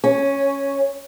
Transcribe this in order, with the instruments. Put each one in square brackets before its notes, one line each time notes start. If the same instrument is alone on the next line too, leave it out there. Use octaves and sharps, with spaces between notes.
[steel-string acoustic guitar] C#4